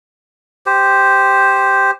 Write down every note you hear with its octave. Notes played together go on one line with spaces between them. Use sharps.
G4 C5